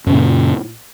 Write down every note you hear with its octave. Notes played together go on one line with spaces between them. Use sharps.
F#2 A#2 C#3